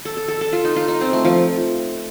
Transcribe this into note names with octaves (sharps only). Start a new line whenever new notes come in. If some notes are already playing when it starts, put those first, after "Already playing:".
A4
A4
A4
A4
F4
D#4
F4
D#4
C4
A3
F3